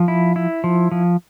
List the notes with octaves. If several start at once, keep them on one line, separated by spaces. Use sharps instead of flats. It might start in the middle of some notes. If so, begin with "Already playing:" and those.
Already playing: F3
E4
E4
F3
F3